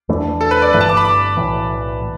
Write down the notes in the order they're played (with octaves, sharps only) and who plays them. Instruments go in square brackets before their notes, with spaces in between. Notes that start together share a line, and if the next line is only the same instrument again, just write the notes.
[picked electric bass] E2 E3 A3 D4
[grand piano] A4
B4
D5
[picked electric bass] G1 G2 E3 A3 [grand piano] B4
[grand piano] A5
D6
B5
D6
[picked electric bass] B1 A2 E3